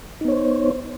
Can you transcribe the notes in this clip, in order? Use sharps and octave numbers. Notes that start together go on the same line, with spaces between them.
B3 D#4 C5 C#5